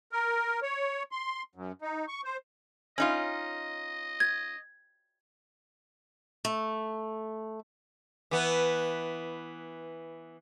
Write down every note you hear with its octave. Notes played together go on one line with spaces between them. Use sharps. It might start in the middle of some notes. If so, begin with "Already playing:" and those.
A#4
C#5
C6
F#2
D#4
C#6
C5
C#4 D#4 F4 D#5
G#6
A3
E3 B3